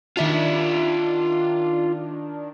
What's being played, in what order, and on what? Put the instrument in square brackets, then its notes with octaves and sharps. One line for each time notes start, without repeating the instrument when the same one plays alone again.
[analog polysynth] D#3 D4 [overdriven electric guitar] F4 E5